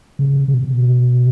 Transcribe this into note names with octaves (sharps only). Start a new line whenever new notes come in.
C#3
C#3
B2